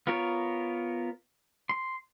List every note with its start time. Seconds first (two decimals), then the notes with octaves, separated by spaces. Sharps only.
0.07 B3 F4 A#4 C#5
1.69 C6